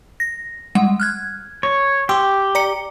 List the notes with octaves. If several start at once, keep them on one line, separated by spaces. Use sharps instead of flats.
A#6
G3 G#3 F#5
F6 F#6 G#6
C#5
G4 C6 D6 E6
D5 A#5 C#7